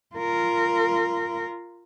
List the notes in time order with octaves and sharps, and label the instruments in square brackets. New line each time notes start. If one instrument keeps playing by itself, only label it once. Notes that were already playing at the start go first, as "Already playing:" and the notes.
[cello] F4 A#4